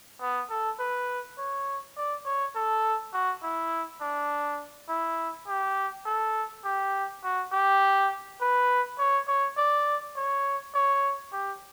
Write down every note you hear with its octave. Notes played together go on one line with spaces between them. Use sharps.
B3
A4
B4
C#5
D5
C#5
A4
F#4
E4
D4
E4
G4
A4
G4
F#4
G4
B4
C#5
C#5
D5
C#5
C#5
G4